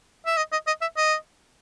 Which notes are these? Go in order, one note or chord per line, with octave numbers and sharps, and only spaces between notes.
E5
D#5
D#5
D#5
E5
D#5